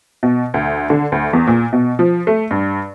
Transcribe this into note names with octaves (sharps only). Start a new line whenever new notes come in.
B2
D2
D3
D2
E2
A#2
B2
F3
A3
G2